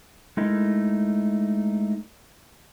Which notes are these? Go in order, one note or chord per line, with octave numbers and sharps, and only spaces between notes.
G#3 A3 D#4 E4 A#4